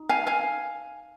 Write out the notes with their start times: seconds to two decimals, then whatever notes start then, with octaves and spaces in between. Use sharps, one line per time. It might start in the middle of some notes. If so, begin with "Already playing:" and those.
Already playing: D#4
0.09 F5 G#5
0.27 F5 G#5